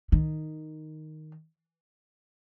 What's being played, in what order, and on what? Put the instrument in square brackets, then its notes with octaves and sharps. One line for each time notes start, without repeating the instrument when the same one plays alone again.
[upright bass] D#3